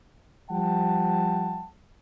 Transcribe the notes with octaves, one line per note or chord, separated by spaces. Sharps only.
F3 G3 F#5 G5 A5